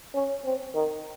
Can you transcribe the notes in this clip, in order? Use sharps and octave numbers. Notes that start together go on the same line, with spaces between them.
C#4
C4
D#3